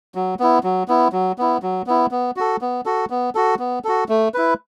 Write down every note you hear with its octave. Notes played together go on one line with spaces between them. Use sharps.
F#3
B3 E4
F#3
B3 E4
F#3
B3 E4
F#3
B3 E4
B3
F#4 A4
B3
F#4 A4
B3
F#4 A4
B3
F#4 A4
A3
E4 B4